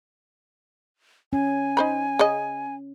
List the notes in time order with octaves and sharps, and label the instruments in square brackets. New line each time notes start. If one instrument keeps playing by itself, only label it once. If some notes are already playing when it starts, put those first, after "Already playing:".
[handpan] C#4 [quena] G#5
[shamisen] D#4 C5 B5
C#3 G#4 D#5